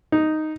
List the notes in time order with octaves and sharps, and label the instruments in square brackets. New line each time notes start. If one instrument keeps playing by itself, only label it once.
[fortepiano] D#4